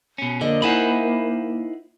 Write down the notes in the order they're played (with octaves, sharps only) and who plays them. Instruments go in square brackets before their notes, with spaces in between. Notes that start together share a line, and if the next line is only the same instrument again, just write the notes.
[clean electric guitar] B2 C#4
[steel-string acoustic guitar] F2 D5 D#5 [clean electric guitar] D3 [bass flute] A#3
[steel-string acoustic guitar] D#4 E4 F#5 [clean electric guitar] C5 G#5 B5